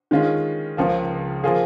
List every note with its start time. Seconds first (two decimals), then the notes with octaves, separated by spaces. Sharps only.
0.11 D#3 G#3 C#4 F4
0.77 C#2 C#3 F3 A#3
1.44 F3 A#3 F4 G#4